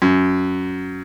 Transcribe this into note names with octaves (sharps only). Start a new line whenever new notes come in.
F#2